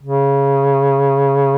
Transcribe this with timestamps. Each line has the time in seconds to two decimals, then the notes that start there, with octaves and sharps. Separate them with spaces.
0.03 C#3